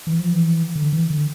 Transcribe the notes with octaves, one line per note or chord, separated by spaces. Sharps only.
E3
F3
E3
D3
E3
D3